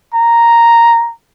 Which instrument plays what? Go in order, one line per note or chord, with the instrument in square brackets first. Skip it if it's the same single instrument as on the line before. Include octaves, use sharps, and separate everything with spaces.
[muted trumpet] A#5